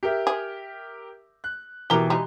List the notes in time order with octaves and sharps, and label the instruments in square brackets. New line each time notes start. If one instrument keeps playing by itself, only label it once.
[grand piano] G4 A#4 E5
[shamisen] G#4
[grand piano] F#6
[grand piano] B2 E3 G7 [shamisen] G4 A#4
[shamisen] G3 G#3 D#4